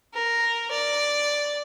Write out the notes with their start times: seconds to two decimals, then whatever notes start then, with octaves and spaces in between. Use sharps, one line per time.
0.14 A#4
0.71 D5